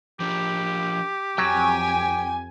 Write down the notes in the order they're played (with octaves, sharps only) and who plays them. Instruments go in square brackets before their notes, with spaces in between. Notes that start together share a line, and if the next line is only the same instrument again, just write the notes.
[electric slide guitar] F3 D4 [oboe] G4
[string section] F2 G#5 [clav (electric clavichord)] F#3 [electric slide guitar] G5